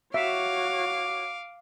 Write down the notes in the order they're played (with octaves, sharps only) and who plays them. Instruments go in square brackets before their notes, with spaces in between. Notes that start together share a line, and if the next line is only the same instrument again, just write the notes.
[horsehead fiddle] F#4 C#5 [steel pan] E5 [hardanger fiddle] F5 [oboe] D6